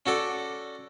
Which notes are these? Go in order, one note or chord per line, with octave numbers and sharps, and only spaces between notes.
C#4 F#4 A4 D5